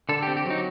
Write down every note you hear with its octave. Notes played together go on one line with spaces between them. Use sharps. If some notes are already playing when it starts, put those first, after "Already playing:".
D3 A4
G4
C4
G4
F#3 D#4